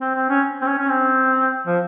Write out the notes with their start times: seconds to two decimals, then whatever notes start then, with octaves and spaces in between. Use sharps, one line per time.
0.01 C4
0.15 C4
0.30 C#4
0.62 C4
0.66 C#4
0.78 C#4
0.89 C4
1.67 F3